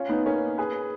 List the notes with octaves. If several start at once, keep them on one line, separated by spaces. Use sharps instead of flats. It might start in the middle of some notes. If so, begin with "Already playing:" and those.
Already playing: C#4 F4
B3 D#4
A#3 C#4
G#4 B4